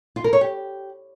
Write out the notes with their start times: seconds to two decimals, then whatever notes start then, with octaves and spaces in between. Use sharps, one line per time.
0.16 F4
0.24 A#4
0.33 C#5
0.41 G4